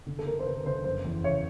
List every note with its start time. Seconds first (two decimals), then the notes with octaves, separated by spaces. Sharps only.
0.06 D3
0.19 A4
0.26 D3 A#4
0.39 C5
0.46 D3 B4
0.65 D3 C5
0.84 F#1 C5
1.05 E2
1.23 C#3 C#5